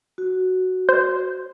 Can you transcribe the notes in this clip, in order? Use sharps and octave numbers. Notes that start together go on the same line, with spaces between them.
F#4
C5